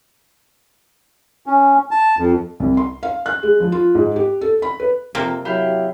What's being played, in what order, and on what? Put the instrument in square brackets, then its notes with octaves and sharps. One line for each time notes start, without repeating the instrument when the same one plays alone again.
[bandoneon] C#4
A5
F2
[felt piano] C2
C6
F5
F#6
G#3
F3
F4
G#2
G4
A4
B5
B4
[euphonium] F2 [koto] C3 A#3 C4
[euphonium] F#3 [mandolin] E4 G4 F5